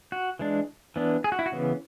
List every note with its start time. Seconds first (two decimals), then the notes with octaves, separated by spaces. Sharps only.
0.12 F#4
0.39 E3 G#3 D4
0.96 E3 B3 D4
1.24 G#4
1.32 F#4
1.39 E4
1.46 F#4
1.52 C#3 E3 B3